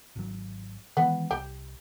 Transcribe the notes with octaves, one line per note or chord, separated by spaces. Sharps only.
G#1 F#3
D#3 E3 G#3 B3
C2 G4